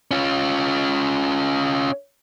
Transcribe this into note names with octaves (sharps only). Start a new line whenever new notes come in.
C#4 F4